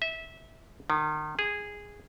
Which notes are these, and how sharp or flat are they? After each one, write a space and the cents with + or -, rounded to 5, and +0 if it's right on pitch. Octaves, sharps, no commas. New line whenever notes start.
E5 -20
D#3 -35
G#4 -10